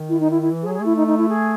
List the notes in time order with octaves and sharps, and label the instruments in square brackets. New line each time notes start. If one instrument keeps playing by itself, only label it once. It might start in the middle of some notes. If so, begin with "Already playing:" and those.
Already playing: [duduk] D#3
[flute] E4
D#4
E4
E4
[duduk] E3
[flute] G#4
[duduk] F#3
[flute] G#4
[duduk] A3 [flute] E4
[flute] D#4
D#4
E4
G#4